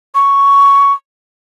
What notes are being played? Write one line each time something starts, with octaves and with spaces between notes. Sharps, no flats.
C#6